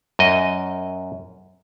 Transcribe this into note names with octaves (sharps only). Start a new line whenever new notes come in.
F#2 D#5